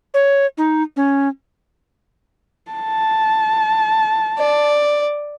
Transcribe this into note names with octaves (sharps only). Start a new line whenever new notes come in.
C#5
D#4
C#4
A5
D5